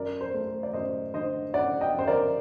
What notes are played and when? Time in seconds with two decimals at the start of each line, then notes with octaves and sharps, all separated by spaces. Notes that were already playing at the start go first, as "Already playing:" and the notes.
Already playing: F#2 A#4 D5
0.21 C5
0.34 A3
0.47 C5
0.63 D5
0.73 F#2 C5 D#5
1.14 D3 C5 D#5
1.54 F#2 D5 F#5
1.81 D#5 G5
1.94 F#2 C5
2.07 A#4 D5